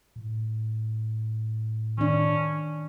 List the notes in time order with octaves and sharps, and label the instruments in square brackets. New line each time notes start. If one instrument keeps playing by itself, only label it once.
[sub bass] A2
[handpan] D#3 D4 [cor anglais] C#4